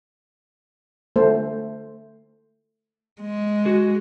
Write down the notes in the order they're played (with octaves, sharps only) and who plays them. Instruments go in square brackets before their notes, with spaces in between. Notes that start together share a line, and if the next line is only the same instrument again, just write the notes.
[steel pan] A3 C5
[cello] G#3
[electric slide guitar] F#4 G#4